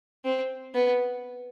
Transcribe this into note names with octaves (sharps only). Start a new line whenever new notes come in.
C4
B3